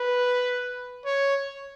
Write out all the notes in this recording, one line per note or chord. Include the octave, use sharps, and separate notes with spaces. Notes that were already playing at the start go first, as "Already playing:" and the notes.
Already playing: B4
C#5